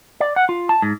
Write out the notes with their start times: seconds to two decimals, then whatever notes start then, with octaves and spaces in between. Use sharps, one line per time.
0.20 D5
0.36 F#5
0.49 F4
0.69 A5
0.82 G#2